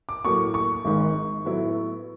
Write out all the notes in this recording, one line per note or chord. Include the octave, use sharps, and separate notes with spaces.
D6
A2 F#3 A#3 C#6
C#6
G#1 G#2 D#3
A2 F#3 B3 E4